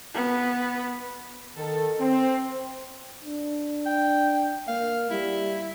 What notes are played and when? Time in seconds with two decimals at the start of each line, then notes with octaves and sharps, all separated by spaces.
0.14 B3
1.57 D#3 A4
2.00 C4
3.25 D4
3.86 G5
4.68 A#3 F5
5.11 G3 E4